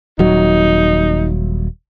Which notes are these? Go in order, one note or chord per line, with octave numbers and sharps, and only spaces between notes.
D#1 F#3 D#4